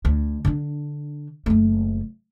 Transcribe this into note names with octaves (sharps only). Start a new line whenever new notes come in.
D2
D3 D4
F#1 A3